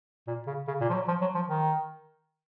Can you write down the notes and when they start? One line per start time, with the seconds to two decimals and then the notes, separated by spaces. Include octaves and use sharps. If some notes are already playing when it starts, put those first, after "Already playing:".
0.27 A#2
0.47 C#3
0.68 C#3
0.81 A#2
0.90 F3
0.94 F#3
1.08 F3
1.21 F#3
1.35 F3
1.48 D#3